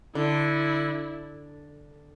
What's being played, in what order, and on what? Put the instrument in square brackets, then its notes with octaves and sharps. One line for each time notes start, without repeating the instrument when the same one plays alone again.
[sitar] D3 [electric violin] E4